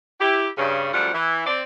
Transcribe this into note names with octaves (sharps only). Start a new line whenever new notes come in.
E4 G4
G2 C#3
F#2 F3 G3 A3 F4 F#5
E3 E4
C4 D5